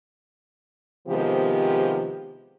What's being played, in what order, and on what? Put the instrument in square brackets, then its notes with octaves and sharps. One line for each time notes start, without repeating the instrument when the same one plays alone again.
[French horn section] C3 D#3 F3 G#3 B3 G4